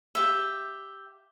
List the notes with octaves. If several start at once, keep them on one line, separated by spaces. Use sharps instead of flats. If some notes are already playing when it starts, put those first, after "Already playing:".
G4 E5